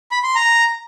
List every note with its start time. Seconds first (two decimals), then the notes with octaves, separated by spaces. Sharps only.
0.11 B5
0.23 C6
0.35 A#5